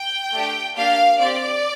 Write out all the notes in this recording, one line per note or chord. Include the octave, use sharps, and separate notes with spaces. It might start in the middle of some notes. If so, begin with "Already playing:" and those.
Already playing: G5
A3 D4 G4
A#3 D4 G4 F5
C4 G4 D5